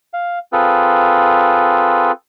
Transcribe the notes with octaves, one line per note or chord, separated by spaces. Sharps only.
F5
C4 F4 G#4 A4 B4